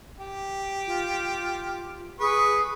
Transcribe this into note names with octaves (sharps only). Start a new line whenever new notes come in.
G4
F4
G#4 B4 C#6